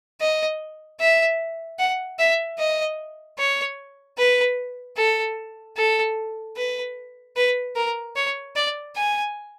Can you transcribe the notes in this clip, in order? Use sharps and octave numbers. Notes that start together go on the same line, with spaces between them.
D#5
E5
F#5
E5
D#5
C#5
B4
A4
A4
B4
B4
A#4
C#5
D5
G#5